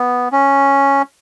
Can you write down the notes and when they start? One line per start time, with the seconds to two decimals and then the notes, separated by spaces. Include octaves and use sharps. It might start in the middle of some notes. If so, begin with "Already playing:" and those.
Already playing: B3
0.32 C#4